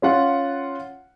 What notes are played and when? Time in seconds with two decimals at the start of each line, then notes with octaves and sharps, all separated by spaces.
0.02 C#4 F4 F#5